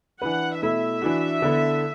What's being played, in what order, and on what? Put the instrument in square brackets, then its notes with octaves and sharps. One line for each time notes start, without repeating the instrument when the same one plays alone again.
[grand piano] E3 D4 B4 [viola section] F#5
[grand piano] B2 A3 E4 [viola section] E5
[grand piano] E3 D4 F#4
D3 B3 E4 A4